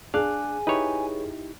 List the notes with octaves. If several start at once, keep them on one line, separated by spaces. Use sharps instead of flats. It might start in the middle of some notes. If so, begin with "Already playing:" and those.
D4 G#4 F5 G#5 D6 F#6
D#4 E4 G4 B4 C#5